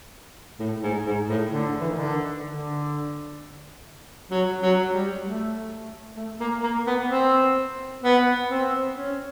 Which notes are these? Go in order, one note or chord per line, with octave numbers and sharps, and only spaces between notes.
A2
G#2
G#2
A2
D3
E3
D#3
D3
D3
F#3
F#3
G3
A3
A3
A#3
A#3
B3
C4
B3
C4
C#4